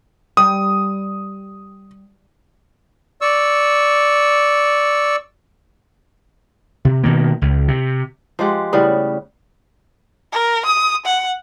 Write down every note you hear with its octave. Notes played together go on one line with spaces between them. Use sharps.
G3 D#6
D5 C#6 E6
C3
B2 D#3 A#3
C#2
C3
F3 G#3 G4 F#5
A2 C#3 G3 B3
A#4
D#6
F#5